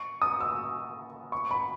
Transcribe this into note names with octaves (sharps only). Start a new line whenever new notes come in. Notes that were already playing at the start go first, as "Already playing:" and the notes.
Already playing: C#6
D#6
E6
C#6
B5